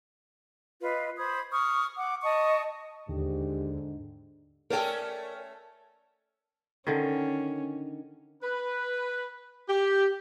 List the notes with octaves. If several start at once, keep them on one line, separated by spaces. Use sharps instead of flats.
F4 B4 D#5
C5 B5 D#6 G#6
C#6 D#6 F6
F#5 D6
D#5 A5 C#6 D#6
D#2 G#2 D3 G4
A3 C#4 A4 A#4 D5 G5
D3 D#3 C#4
B4
G4